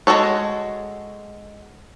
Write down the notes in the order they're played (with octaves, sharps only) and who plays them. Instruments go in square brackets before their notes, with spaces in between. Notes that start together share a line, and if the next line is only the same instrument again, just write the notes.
[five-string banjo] G#3 A#3 F#4 A4 C#5